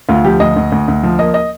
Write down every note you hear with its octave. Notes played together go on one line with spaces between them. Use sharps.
D2 F4
F3 G4
D2 D#5
D2
D2
D2
F3
A#3 D#5
D#5